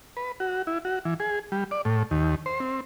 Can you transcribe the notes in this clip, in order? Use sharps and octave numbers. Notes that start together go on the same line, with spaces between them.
B4
F#4
E4
F#4
E3
G#4
G3
D5
A2
D#2
C5
C4